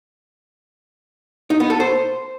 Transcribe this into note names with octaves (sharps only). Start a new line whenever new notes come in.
D#4
B3
A4
C5